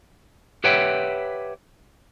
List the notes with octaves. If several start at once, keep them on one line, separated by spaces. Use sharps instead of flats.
G4 B4 C#5 E5 F#5 G5